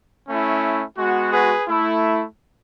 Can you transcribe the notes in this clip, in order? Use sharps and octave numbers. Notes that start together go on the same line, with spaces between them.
A3 C#4 E4
G#3 B3 F#4
G#4 B4
A3 E4